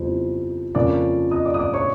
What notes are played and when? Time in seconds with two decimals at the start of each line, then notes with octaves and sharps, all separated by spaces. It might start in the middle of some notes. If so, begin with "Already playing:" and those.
Already playing: F2 C#3 E3 G3 B3 C5
0.75 F2 C#3 F3 A#3 C#4 D5 D6
1.31 D#5 D#6
1.45 D5 D6
1.54 D#6
1.59 D5 D6
1.74 C#5 C#6